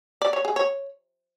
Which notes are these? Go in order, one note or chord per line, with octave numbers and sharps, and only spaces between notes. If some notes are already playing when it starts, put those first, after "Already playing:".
D5
C#5
G#4
C#5